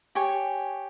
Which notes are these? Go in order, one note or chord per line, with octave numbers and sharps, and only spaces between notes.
G4 C#5 G#5